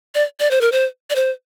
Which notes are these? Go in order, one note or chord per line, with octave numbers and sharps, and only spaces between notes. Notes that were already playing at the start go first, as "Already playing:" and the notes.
D5
D5
C5
A#4
C5
D5
C5